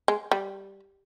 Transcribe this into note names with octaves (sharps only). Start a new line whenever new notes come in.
G#3
G3